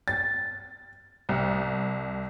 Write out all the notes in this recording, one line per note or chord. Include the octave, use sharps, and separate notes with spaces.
A6
C2